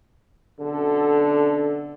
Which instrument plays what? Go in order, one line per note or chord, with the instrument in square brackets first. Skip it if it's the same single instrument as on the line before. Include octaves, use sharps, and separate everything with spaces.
[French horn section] F#2 B2 A4 [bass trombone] D3